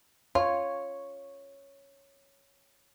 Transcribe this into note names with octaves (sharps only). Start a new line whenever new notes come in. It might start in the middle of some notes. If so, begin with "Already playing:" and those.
F4 C#5